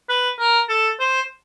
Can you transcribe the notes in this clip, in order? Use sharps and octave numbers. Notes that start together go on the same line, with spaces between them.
B4
A#4
A4
C5